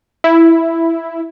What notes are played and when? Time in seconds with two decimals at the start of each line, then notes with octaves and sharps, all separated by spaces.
0.24 E4